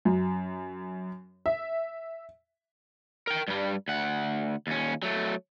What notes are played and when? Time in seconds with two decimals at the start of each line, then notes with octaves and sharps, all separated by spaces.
0.05 F#2
1.46 E5
3.27 A#4 G5
3.48 G2 G3
3.88 D2 F#5
4.67 D#2 C#4
5.03 F#3 A3